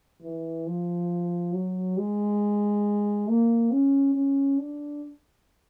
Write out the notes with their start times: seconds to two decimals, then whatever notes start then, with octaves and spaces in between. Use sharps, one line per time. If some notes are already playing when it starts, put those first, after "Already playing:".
0.22 E3
0.67 F3
1.53 F#3
1.98 G#3
3.28 A#3
3.71 C#4
4.14 C#4
4.58 D4